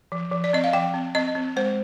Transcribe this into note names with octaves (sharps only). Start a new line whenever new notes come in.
F3
F3
D5
C4 D#5
F5
F3 G5
C4
C4 D#5
C4
G#3 C5